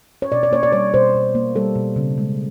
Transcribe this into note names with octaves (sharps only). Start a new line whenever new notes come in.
C#5
B2 D5
D5
A#3 C#5
D5
G3 C#5
B2 C5
B2
A#3
G3 A4
B2
C#3
G#3